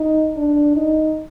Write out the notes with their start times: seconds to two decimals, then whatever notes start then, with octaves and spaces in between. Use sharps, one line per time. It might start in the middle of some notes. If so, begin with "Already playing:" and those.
Already playing: D#4
0.37 D4
0.76 D#4